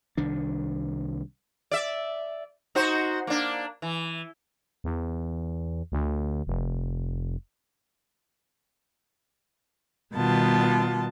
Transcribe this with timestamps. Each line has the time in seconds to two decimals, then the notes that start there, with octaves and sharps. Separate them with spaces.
0.17 C2 D#3 D4
1.71 D5 E5
2.75 D#4 F#4 C5
3.27 A#3 D4
3.82 E3
4.84 E2
5.92 D2
6.47 F1
10.15 B2 D#3 G3 B3 F4 A5